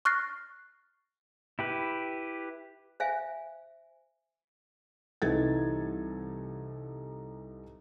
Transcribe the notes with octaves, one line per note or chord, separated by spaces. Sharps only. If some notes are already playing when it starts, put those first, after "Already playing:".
C#6 F6 F#6 A6 A#6 C7
E4 G4 B4
C5 E5 F5 G#5
C2 E3 D#4 A4 G#6 A6